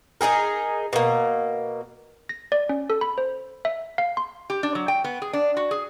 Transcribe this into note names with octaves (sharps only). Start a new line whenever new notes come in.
D#4 E4 G#4 A#4
B2 A#3
A#6
D5
C#4
A4
B5
C5
E5
F5
C6
G4
D4
F#3
G5
B3
G#4
D4
F#4
G#4